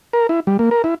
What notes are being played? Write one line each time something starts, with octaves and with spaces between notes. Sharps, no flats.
A#4
E4
G3
A#3
A#4
E4